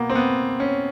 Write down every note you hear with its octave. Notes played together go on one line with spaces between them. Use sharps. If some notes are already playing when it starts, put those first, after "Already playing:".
Already playing: B2 A#3 B3
C4
B3
C#4